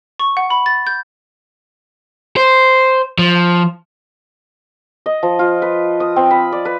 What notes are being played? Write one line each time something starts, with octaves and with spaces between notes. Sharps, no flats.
C#6
F#5
B5
A6
G6
C5
F3
D#5
F3
F4
B4
D#6
C4
B5
D5
B4